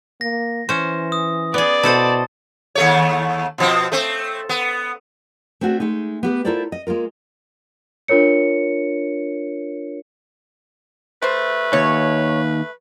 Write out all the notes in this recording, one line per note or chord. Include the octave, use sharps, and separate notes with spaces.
A#3 A#6
E3 C#4 C5
D#6
B3 G#4 D5
B2 E4 A4 C5 A5 D#6 A6
D#2 A3 C#5
B2 F3 C4
A3 C4
B3
A3 C4 D4 F#4 G#4
G#3 A3 D#4
B3 G4 B4
E4 F4 A4 A#4 C5 D5
D#5
G#3 A#3 F4 A#4
D4 F4 A#4 C#5 C#7
A3 B4 C5
D#2 C#5